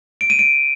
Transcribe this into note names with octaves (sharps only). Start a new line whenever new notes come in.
D7
D#7
D7